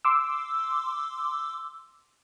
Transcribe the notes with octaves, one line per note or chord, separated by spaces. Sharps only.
C6 D6 E6